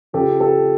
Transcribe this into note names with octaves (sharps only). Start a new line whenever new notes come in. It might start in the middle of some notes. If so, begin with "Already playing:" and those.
C#3 F3 G4 A4
G4 A4